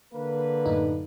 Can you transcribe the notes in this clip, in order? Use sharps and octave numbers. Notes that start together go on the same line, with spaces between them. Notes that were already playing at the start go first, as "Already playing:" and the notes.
D3 A#3 B4
F#2 A2 D#4